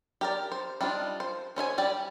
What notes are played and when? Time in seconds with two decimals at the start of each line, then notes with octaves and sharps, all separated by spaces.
0.21 G4 A#4 D5
0.52 C5
0.81 G3 D4 D#4 F4
1.20 C5
1.56 C#4 C5 E5 G#5
1.78 G3 G4 D5